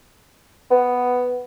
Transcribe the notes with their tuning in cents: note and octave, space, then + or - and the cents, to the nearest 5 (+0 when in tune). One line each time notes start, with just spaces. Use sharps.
B3 +5